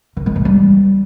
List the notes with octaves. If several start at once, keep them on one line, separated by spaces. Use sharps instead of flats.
D#3
G#3
E3
G3